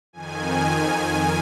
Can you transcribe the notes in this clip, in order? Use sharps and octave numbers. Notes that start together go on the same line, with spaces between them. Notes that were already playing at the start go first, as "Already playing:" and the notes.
F2 D#3 G#5